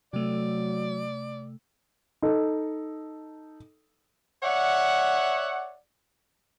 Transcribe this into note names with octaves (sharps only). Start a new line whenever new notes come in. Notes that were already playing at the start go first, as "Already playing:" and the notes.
C3 F#3 A3 D5
D#4 A4
C#5 D5 E5 F#5